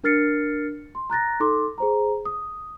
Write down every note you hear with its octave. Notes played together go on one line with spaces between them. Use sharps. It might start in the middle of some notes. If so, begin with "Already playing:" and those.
D4 A#4 F6 A6 C7 C#7
C6
A#5 F#6 A6 A#6
D#4 A4 C6 D6
G#4 C5 A#5
D#6